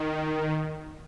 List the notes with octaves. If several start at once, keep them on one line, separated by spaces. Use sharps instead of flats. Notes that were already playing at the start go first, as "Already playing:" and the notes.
Already playing: D#3